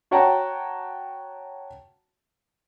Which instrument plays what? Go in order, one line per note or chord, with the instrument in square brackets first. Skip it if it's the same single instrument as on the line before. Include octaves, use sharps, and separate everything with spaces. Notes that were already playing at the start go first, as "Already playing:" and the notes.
[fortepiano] F#4 C#5 F#5 G5 A5 A#5